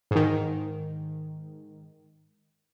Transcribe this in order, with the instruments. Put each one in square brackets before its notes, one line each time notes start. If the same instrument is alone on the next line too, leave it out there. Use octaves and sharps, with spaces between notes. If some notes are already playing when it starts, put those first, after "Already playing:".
[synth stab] G#2 D#3